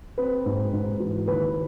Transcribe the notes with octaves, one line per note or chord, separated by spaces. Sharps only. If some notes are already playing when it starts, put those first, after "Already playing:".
C4 B4
G#2
G#2
E3
D#2 B4